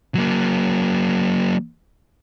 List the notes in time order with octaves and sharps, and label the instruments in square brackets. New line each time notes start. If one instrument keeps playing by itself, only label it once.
[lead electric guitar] F#3 A#3